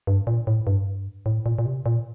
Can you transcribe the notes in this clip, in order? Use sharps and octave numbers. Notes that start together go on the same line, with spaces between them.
G2
A#2
A2
G2
A2
A#2
A#2
C3
A#2